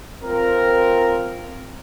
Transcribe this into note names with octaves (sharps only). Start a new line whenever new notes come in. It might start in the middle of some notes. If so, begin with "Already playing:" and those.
C4 F4 A#4